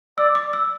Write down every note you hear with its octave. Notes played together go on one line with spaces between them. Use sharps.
D5 E6
D6
E6